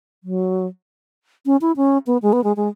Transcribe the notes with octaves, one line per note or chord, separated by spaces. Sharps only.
F#3
C#4
E4
C#4
B3
G#3
B3
G#3
G#3